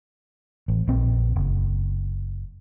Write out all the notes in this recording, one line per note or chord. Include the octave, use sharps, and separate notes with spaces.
A1
A#1 C4
F#1